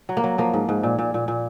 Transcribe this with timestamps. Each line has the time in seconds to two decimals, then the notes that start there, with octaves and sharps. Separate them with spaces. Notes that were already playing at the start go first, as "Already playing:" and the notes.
0.09 F#3
0.17 A#3
0.24 F#3
0.38 F3 A#3
0.53 G#2
0.69 G#2
0.83 A#2
0.99 A#2
1.14 A#2
1.28 A#2